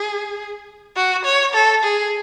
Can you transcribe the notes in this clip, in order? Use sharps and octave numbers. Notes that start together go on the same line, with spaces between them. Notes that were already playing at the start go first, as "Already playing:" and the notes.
Already playing: G#4
F#4
C#5
A4
G#4